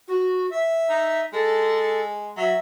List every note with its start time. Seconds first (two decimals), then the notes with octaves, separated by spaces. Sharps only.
0.08 F#4
0.51 E5
0.90 D#4
1.33 G#3 A4
2.37 F#3 E5